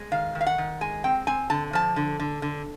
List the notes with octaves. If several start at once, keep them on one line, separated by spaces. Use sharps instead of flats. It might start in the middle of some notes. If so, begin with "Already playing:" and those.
Already playing: G#3
D#3 F5
D#3
F5
F#5
D#3
G#3 G#5
C4 G5
C4 G#5
D3 A5
F3 A5
D3
D3
D3